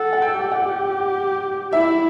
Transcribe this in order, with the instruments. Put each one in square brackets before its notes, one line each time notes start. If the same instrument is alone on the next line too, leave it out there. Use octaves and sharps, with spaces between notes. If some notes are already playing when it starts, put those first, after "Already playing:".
Already playing: [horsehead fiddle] A4 [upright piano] F#5
[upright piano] F#5
G5
[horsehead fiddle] G4
[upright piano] F#5
[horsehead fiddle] E4 [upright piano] E5